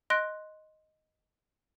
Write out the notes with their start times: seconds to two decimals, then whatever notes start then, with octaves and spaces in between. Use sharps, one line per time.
0.10 D#5 C6 F#6 A#6 D7